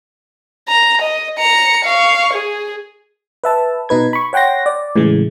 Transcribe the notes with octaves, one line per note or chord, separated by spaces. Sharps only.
A#5
D#5
A#5 C#7
F5 C#6
G#4
B4 E5 A5
B2 D#4 B4 G#6
B5 C#6
C#5 F#5 G5 C6 A#6
D5
A2 C#3 E3 G#3